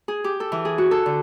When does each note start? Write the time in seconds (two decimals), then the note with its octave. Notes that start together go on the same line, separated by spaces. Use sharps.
0.08 G#4
0.24 G4
0.40 A4
0.52 E3
0.65 G#4
0.78 F#4
0.91 A4
1.06 D3